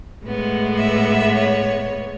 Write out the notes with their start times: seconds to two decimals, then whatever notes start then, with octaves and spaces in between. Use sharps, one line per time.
0.24 A2 G#3 B3
0.79 E5
1.35 C#5